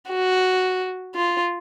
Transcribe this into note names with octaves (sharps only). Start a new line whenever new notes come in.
F#4
F4